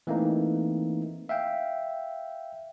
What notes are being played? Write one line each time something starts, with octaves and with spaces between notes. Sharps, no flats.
E3 A3 A#3 C4 D#4
E5 F5 G5